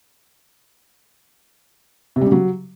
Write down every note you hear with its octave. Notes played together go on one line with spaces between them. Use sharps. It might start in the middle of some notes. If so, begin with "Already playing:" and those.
C3
G3
C#3
F#3